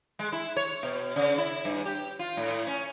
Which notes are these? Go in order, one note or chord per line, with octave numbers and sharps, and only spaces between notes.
G#3
E4
C#5
B2
C#3
E4
G2
G4
F4
A2
C#4